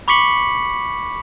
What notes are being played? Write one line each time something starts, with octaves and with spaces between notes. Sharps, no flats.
B5 C#6 D6 B6 C#7 F#7